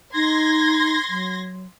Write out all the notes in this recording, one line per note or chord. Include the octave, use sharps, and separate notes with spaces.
D#4 C6 G#6 A#6
F#3